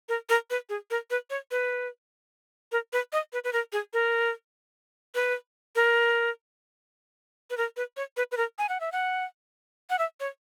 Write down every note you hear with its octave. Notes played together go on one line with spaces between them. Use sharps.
A#4
A#4
B4
G#4
A#4
B4
C#5
B4
A#4
B4
D#5
B4
B4
A#4
G#4
A#4
B4
A#4
B4
A#4
B4
C#5
B4
B4
A#4
G#5
F#5
E5
F#5
F#5
E5
C#5